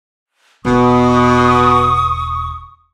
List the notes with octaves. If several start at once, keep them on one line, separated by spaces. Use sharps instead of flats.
E1 B2 C#6 D#6